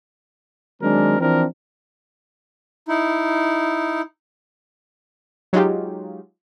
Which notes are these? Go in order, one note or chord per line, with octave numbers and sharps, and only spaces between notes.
D#3 F#3 G#3 C4 D4 A#4
E3 F3 C4 D4 E4 A#4
D#4 E4
F#3 G#3 D#4 F4 G4